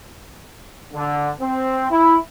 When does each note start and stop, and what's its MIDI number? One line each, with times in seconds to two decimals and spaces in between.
0.94 1.31 50
1.40 1.86 60
1.90 2.16 64